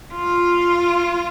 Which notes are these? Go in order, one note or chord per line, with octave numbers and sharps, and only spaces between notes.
F4